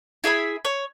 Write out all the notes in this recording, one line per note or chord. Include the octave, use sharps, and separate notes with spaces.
E4 G#4 E5 B5
C#5